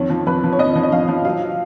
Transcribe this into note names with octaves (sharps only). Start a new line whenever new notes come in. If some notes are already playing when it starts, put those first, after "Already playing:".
Already playing: F2 D#3 C#5
F3
F2 B4
F3
C#5
F2 D#5
F3
D#5
F2 F5
F3
F#3 F5